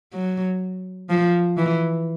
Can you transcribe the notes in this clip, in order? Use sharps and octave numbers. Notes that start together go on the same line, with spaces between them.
F#3
F3
E3